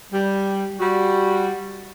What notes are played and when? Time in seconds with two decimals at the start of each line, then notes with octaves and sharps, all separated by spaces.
0.13 G3
0.80 G3 F#4